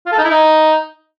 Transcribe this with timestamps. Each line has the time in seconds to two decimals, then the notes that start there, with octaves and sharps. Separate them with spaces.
0.06 F4
0.12 A4
0.18 D#4
0.24 E4
0.30 D#4